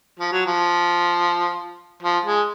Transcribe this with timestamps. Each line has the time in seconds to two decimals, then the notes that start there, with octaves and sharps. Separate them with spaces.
0.20 F3
0.32 F#3
0.46 F3
2.03 F3
2.26 G#3